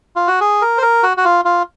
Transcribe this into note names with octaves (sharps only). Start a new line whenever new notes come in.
F4
F#4
G#4
A#4
C5
A#4
F#4
F#4
F4
F4